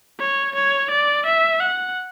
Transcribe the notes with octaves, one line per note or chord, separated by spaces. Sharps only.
C#5
C#5
D5
E5
F#5